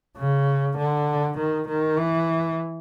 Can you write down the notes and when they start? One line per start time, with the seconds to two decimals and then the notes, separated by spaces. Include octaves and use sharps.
0.17 C#3
0.77 D3
1.38 D#3
1.68 D#3
1.99 E3